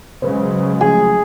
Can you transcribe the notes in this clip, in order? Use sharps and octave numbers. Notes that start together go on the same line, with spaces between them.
C#3 F#3 G#3 B4 C5
F3 A3 G#4